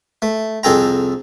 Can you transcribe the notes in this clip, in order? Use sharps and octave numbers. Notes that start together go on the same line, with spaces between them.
A3
C2 F2 G#4 A4 G5 A#5